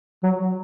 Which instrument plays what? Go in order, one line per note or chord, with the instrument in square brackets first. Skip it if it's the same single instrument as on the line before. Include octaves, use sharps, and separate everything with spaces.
[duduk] F#3